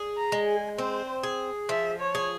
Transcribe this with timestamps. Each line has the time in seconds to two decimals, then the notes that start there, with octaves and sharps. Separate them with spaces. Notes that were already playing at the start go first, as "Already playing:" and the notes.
Already playing: G#4
0.17 A#5
0.32 G#3
0.47 G#5
0.78 C4 C5
1.24 G#4
1.69 F3 E5
2.00 C#5
2.15 G#4